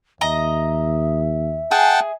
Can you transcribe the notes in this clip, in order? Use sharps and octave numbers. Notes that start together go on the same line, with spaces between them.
D#2 D#5 E5 A#5
G#4 F#5 G5 A5